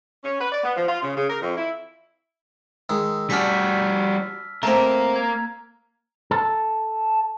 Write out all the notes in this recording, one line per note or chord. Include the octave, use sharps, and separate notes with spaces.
C#4
B4
D5
B3
F3
F4
C#3
C#3
A#4
F2
E4
D#3 G#3 E6
G3 D4 F#4 G#5 A#5 F6 B6
A3 A#3 C4 A#4 A#5
G#6
A4